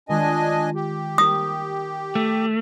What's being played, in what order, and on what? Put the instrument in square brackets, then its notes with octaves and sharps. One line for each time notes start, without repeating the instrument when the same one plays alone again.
[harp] D#3 G#3 F4 [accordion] D4 D#5 G#5
[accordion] G4
[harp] A#3 D#4 A#4 [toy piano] D#6
[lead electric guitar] A3